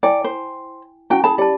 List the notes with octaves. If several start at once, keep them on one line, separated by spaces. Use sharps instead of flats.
E4 D5 G5 G#5
C5
C#4 E4 F#4 G5
G#4 A5 B5
G4 D5 A5